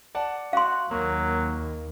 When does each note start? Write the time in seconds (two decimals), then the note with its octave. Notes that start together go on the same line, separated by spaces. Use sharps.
0.15 D5 F#5 A5
0.53 F#4 F5 C6
0.91 D#2 F#3 A#3